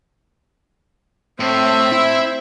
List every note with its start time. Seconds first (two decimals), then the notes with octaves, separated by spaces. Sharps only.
1.40 A2 C4 E5
1.92 E4